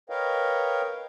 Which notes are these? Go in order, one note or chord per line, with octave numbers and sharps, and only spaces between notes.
A#4 B4 C#5 D#5 F5 G5